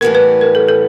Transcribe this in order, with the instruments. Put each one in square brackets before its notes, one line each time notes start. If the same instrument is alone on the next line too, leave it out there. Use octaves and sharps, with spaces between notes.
[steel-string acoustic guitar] A2 E3 G3 B3 [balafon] A#4
[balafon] B4
A#4
A4
A4